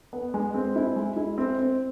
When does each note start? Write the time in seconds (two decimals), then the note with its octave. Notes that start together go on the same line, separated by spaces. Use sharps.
0.13 B3
0.34 G#3
0.54 C4
0.76 E4
0.96 G#3
1.17 E4
1.38 C4
1.59 C4